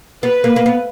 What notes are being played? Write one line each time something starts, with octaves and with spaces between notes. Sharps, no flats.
B3 B4
A#3
A#3
B3